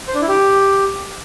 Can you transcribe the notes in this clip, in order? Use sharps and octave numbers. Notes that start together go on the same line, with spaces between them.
C5
D4
E4
G4